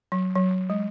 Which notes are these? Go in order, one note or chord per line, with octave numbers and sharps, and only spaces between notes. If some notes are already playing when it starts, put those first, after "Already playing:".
F#3
F#3
G#3